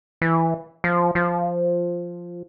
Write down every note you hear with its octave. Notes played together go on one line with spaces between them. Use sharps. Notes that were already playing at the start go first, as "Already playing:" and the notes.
E3
F3
F3